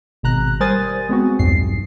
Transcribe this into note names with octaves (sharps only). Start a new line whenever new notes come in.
G#1 B2 A#5 F#6
G3 A#4 C5 G#5 D#6 A6
G#3 B3 C4 F#4
B1 E2 G2 C7